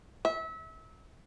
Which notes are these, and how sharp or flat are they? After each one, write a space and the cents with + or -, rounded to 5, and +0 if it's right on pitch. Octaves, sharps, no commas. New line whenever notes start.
E5 -30